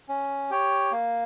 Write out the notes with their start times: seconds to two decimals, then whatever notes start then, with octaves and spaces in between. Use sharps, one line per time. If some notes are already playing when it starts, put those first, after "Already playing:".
0.09 C#4
0.50 G4 C#5
0.92 A#3